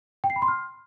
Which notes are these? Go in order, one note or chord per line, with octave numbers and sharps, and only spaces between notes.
G5
C7
B5
C6
F6